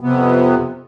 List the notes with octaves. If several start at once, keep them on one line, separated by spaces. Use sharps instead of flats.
F2 C3 B3